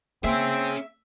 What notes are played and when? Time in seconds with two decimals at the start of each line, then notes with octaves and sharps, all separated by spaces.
0.24 A#3 C4 C#4 G#4 E5